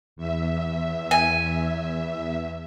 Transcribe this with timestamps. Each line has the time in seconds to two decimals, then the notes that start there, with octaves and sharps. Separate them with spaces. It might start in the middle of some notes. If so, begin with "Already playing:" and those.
0.16 E2 E5
1.11 G#5